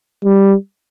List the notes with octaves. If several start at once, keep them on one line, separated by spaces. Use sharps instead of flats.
G3